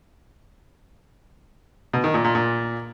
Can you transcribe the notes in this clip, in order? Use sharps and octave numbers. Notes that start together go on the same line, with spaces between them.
B2
D#3
A#2
A#2
A#2